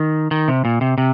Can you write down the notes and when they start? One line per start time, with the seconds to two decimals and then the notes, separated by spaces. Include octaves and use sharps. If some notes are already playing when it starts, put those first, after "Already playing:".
Already playing: D#3
0.31 D#3
0.48 C3
0.65 A#2
0.81 C3
0.98 C3